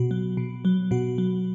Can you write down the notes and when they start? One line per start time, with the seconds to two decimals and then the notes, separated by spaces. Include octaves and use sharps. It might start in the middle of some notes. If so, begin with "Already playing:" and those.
Already playing: B2 F#4
0.11 F#3
0.37 B2
0.65 F#3
0.91 B2 F#4
1.18 F#3